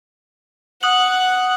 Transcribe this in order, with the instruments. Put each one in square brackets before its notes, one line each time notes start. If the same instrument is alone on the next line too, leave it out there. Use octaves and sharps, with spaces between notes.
[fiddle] F#5 [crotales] D#6 F#6 F#7